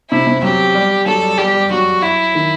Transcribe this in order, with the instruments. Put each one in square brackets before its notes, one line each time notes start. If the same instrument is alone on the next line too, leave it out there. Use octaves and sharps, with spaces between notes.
[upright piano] C3 [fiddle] E4
[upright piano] C3
[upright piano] F#3 [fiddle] G4
[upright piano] G3
[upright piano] F#3 [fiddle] A4
[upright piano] G3
[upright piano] G3 [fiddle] G4
[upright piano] G3
[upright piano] F#3 [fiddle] F#4
[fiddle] E4
[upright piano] D#3